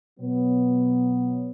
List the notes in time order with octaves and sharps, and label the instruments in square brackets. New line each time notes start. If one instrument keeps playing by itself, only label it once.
[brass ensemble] B2 F#3 B3